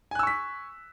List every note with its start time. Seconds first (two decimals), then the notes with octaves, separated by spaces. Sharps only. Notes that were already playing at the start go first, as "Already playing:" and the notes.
0.11 G#5
0.15 F#6
0.19 E6
0.23 C#6
0.27 B6